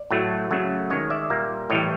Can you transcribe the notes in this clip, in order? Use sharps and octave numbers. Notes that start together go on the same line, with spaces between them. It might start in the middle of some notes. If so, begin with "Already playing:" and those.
Already playing: D5
A2 F#3 A3
C#3 F#3 A3
D#3 G#3 C#5 D#5
D5 E5
A#2 G3 A#3
A2 E3 G3 C#5 D#5